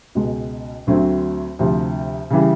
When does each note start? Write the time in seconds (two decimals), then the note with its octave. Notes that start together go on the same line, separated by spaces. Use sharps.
0.15 C#2 B2 G#3
0.87 D2 D3 F#3 A3 C4
1.59 D2 C3 F3
2.31 C#3 E3 G3